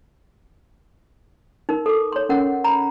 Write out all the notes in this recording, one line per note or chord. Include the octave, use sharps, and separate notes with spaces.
D#4 A#4
A4 D6
C#5 C6
C#4 A#4 F#5
A#5 B5